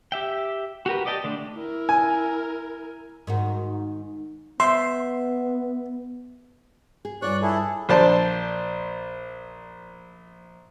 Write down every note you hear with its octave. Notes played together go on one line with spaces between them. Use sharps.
G4 E5 G5
F#4 G4 A#4 B4
G4 D5 D#5 G5 A5
D3 A3 D4
E4 A#4
G#5
G#2 D#3 F#4
B3 E5 C6
G#4
G2 F4 C#5 D5 C#6 F#6
E4 G#4 A4
A#1 C5 D5 A5